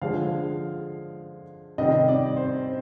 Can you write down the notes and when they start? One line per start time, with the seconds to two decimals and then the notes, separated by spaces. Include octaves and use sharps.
0.02 D3 F3 G#3 F5
1.78 C3 D#3 G3 D#5
2.08 D5
2.36 C5